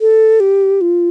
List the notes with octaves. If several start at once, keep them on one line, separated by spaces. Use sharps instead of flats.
A4
G4
F4